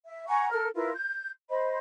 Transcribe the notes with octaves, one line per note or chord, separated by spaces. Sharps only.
E5
F#5 G#5 A#5 C#6
A4 A#4 F6
E4 F4 A#4 B4
G6
C5 D#5 B5